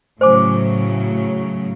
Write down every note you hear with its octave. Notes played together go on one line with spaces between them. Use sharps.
A2 C#3 F#3 C5 G#5 D6